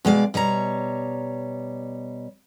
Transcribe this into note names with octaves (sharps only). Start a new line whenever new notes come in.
B2 G#3 D5 F5
B2 G3 C#5 A#5